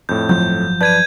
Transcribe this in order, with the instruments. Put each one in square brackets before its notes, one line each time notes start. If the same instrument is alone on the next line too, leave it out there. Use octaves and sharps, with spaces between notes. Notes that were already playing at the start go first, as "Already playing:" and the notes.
[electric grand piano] F2 A2 [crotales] G6
[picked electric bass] G1 F3 F#3 [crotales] G6
[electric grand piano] B4 D5 A5 [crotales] G6 G#6 D#7